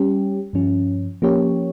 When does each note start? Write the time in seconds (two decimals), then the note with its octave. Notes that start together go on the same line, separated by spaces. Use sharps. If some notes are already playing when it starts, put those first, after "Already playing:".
Already playing: G3 C#4 G4
0.53 G2 F3 C#4
1.22 F3 A#3 C#4 G4 C#5